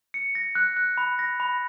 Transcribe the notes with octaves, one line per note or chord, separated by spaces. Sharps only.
C#7
A#6
F#6
F#6
B5
A#6
B5